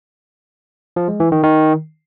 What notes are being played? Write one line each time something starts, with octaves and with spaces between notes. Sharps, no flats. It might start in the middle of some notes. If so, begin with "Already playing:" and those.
F3
G#3
E3
D#3
D#3